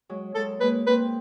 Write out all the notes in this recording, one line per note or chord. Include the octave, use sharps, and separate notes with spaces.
F#3 G#3
F#3 G#3 A4
G#3 A#3 B4
A#3 C4 B4